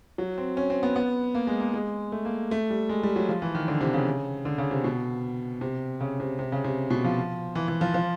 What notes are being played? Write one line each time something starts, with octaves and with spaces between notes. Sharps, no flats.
F#3
C4
C#4
C4
B3
B3
A#3
G#3
A#3
G#3
A3
A#3
A3
G3
G#3
G3
F#3
F3
E3
D#3
D3
C3
C#3
D3
C#3
C3
B2
C3
C#3
C3
C3
C#3
C3
B2
F3
E3
E3
F3
F3